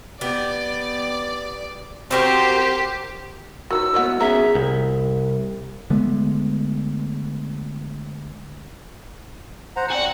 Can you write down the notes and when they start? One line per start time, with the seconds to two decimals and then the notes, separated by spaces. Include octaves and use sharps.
0.21 B3 G4 D5
2.11 C4 F#4 G4 A#4 C5
3.71 D#3 E3 F#3 F#4 E6
3.94 B3 E4 A#4 C#5 D#5 F#5
4.21 D#3 F#3 B3 C#4 G#4 E5 A#5
4.55 C2
5.90 D3 G#3 A3 B3
9.76 C5 F#5 A#5
9.90 C4 F#4 D5 F#5 G#5